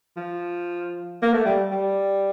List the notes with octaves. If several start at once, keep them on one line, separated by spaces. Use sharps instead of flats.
F3
A#3
A3
G3
G3